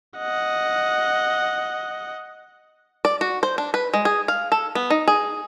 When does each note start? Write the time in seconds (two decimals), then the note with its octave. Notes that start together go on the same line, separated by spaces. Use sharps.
0.18 D#5 F#5
3.05 D5
3.21 F#4
3.43 C5
3.58 D4
3.74 B4
3.94 G#3
4.05 G#4
4.28 F5
4.52 A4
4.75 B3
4.90 D#4
5.08 G#4